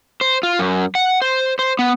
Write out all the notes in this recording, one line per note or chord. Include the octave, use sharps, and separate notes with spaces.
C5
F4
F#2
F#5
C5
C5
B3